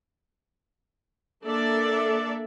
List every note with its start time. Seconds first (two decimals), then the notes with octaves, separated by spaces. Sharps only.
1.44 A#3 D4 A4 D5 E5